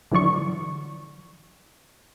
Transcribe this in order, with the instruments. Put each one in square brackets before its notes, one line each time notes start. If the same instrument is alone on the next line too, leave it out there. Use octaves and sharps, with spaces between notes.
[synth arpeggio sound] D3 E3 F#3 D5 C#6